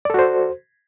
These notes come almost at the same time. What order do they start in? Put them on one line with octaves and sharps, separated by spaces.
D5 A4 F#4 C5